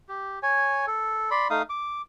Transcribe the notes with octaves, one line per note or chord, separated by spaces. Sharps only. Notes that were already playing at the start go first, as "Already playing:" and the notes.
G4
C#5 G#5
A4
D5 B5 C6
A3 D#4 F5 D#6
D6